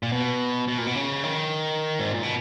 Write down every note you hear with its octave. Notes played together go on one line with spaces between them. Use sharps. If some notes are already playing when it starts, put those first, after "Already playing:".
A#2
B2
B2
A#2
B2
C#3
D#3
G#2
A#2
B2